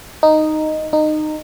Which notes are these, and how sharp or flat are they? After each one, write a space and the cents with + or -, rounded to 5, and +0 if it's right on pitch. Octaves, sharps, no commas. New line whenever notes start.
D#4 -5
D#4 -20